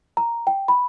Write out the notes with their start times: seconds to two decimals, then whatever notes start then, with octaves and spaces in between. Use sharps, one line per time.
0.17 A#5
0.47 G5
0.68 B5